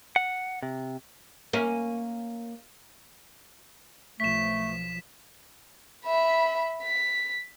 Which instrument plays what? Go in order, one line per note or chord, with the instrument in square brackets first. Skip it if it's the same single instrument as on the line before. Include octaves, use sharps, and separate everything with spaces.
[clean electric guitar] F#5
C3
[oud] A#3 C#4
[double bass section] B1 F3 [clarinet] A3 [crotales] B6 E7
[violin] E5 B5
B6